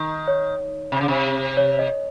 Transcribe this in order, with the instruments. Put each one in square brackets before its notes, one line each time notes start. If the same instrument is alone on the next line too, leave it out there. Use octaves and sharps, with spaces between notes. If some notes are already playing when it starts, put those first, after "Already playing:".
Already playing: [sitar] D#3
[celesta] C#5
[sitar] C3
C#3
C3
[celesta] C#5
D#5